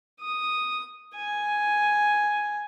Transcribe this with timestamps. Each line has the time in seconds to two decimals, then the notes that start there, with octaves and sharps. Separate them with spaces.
0.21 D#6
1.16 G#5